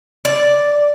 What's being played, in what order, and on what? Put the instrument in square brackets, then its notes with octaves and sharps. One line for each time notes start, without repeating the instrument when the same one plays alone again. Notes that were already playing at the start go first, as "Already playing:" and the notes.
[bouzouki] D5